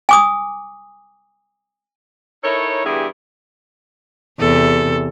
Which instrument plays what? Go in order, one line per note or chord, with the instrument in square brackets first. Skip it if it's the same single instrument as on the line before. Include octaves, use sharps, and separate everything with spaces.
[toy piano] G#5 D6 D#6
[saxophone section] D#4 E4 A4 A#4 C#5
E2 G2 D3 G4 G#4 E5
[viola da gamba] E2 C3 [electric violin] A4